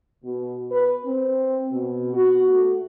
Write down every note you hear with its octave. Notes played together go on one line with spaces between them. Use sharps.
B2
B4
C4
B2
F#4
A3